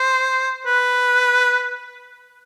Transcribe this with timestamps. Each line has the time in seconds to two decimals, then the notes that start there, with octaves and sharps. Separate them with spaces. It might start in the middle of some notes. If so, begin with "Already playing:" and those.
Already playing: C5
0.66 B4